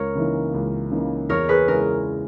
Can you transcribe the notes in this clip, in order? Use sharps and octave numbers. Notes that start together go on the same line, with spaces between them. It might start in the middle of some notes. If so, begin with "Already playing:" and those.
Already playing: C#2 A#4 C#5
C#3 E3 A#3 D#4
C#2
C#3 E3 A#3 D#4
E2 A#4 C#5
G#4 B4
C#3 G#3 C#4 E4 A#4